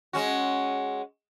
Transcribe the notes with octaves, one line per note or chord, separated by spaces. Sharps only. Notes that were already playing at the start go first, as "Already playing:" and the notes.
G#3 C#4 F#4